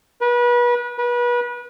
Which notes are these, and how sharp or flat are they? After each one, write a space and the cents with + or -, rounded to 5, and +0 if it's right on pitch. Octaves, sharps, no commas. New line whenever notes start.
B4 -30
B4 -30